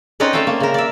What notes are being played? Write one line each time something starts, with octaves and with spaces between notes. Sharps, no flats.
C4 C#4 D#4 B4 C#5 D5
A3 A4 E5 F5 G5
A#3
C#3 A#4
D5 E5